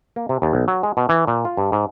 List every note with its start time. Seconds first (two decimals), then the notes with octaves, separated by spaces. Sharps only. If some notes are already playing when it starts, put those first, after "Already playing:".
0.16 A#3
0.29 C3
0.42 D#2
0.53 B1
0.68 F#3
0.83 G#3
0.97 B2
1.09 E3
1.27 A#2
1.45 F4
1.57 G2
1.72 G#2